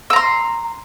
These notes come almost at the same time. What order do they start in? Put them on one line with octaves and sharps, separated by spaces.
E6 A#5 C6